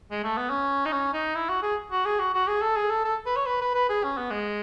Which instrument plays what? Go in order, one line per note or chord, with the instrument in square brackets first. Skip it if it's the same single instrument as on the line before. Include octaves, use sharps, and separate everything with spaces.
[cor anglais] G#3
A3
B3
C#4
D#4
C#4
D#4
E4
F#4
G#4
F#4
G#4
F#4
F#4
G#4
A4
G#4
A4
A4
B4
C#5
B4
B4
B4
G#4
C#4
B3
G#3